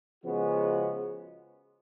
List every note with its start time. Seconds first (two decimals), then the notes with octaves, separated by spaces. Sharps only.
0.24 C#3 F3 G#3 B3 F#4